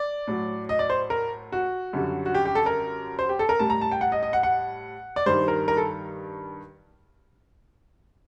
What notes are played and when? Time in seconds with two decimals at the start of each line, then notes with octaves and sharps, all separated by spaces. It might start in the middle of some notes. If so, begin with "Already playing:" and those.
Already playing: D5
0.27 A2 F#3
0.69 D#5
0.79 D5
0.90 C5
1.10 A#4
1.52 F#4
1.93 F#2 D3 G3
2.26 F#4
2.35 G4
2.45 G4
2.55 A4
2.66 A#4
3.19 C5
3.29 G4
3.39 A4
3.49 A#4
3.59 A2 G3 A5
3.70 A#5
3.81 A5
3.91 G5
4.01 F#5
4.12 D#5
4.23 D#5
4.33 F#5
4.43 F#5
5.16 D5
5.26 G2 D#3 G3 C5
5.48 A#4
5.68 A#4
5.77 A4